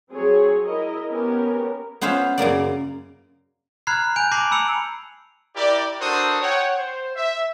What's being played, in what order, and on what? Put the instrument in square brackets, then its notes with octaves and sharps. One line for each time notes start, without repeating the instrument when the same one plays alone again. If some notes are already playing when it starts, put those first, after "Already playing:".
[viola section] F#3 C4 G#4 C#5
E4 A#4 D#5
B3 C#4 G4 A#4
[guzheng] B3 C#4 F4 C5 E5 F5
F#2 C#3 A#3 D5
[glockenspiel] A#5 B5 F6 F#6 G#6 C7
G#5 G6 D7 F7
A5 D6 A#6 C7 D7 F#7
A#5 B5 E6 C#7 F7
[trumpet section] E4 G4 A#4 D5
D4 F#4 A4 A#4 C5 D#6
C#5 F#5 G5
C5
E5